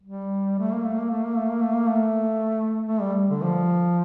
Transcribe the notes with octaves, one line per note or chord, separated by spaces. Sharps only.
G3
A3
A#3
A3
A#3
A3
A#3
A3
A#3
A3
A#3
A3
A3
G3
D3
F3